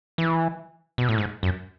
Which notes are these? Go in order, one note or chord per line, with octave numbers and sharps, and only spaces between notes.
E3
B2
A2
G#2
F#2